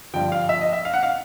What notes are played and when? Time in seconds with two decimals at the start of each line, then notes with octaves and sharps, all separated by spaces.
0.14 G2 D3 F3 G5
0.32 F5
0.49 E5
0.61 D#5
0.73 E5
0.85 F5
0.93 F#5
1.03 F5